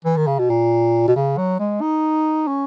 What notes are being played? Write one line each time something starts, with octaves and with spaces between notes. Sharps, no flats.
E3
D#3
C#3
B2
A#2
B2
C#3
F#3
G#3
D#4
C#4